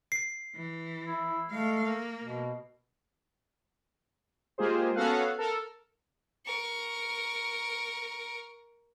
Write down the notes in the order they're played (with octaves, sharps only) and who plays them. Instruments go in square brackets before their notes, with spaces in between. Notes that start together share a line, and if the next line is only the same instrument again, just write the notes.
[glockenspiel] C7
[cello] E3
[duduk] E4
[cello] G#3 F5 [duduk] A3
[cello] A#3
[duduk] B2
[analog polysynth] G#3 A#3 F4 G4 G#4 C5
B3 C#4 F#4 A4 F5 F#5
A4 A#4
[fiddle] A#4 C#6